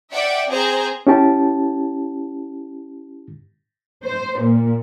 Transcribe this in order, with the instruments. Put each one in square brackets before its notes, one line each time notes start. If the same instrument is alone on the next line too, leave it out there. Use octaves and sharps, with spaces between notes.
[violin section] D5 E5 F#5 G5
C4 G#4 C5 A#5
[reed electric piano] C#4 E4 G4 A5
[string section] C5
A#2